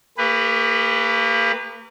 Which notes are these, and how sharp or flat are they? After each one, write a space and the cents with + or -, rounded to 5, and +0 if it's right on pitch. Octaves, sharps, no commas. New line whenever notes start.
A#3 -30 G4 +40 B4 +5